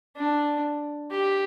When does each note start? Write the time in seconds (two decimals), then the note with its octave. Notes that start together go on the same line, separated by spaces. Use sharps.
0.17 D4
1.11 G4